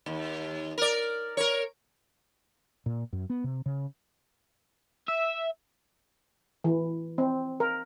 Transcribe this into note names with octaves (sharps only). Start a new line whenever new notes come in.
D#2
A#4 D5
A#4 C#5
A#2
F#2
B3
C3
C#3
E5
E3
C4
A#4